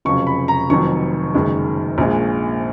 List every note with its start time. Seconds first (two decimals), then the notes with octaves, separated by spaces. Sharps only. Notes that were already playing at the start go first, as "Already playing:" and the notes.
0.05 F1 F2 C#3 F#3 C#6
0.27 B5
0.48 A#5
0.70 F1 F2 D#3 F#3 C#6
1.34 F#1 F#2 D#3 G#3
1.98 A#1 A#2 G#3